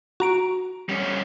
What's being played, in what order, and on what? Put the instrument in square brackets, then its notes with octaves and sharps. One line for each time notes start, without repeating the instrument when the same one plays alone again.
[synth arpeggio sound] F#4 A#5 D7
[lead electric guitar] G3 C#4